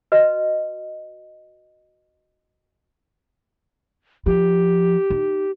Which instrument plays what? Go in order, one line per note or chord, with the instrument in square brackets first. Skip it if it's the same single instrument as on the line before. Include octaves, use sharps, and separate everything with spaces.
[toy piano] F#4 B4 D#5
[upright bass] F3 [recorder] G4
[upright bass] D#4